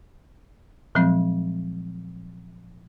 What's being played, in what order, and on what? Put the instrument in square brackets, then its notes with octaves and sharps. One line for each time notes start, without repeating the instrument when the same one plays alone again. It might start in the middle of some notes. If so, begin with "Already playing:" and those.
[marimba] A#2 F3 F#3 G#3 C4